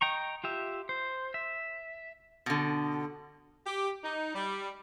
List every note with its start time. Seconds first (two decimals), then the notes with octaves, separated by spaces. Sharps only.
0.01 D#5 G5 A#5 C#6
0.44 F4 G4 E5
0.89 C5
1.34 E5
2.46 B2 D3
3.67 G4
4.03 D#4
4.34 G3